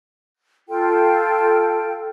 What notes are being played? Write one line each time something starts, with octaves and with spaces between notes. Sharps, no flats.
F4 A4 G5